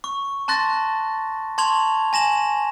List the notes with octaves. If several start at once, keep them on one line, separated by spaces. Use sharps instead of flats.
C#6
A5 C6 F#6 A6 A#6
A5 C6 C#6 G#6 F7 F#7
G#5 A#6 E7 F#7